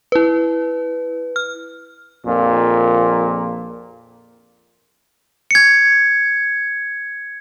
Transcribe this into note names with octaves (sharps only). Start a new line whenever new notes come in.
E4 B4
F6
A#1 F2 A#2 A#3
G#6 C#7